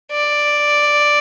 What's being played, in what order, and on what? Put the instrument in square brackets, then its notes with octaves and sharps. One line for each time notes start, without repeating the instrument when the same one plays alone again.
[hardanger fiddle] D5